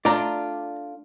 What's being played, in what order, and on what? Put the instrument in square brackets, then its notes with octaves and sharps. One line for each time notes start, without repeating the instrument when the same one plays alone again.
[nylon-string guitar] A3 D4 F4 [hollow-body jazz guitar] D5 A#5